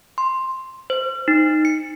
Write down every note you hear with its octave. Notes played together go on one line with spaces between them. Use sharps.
C6
C5
D#4
C#7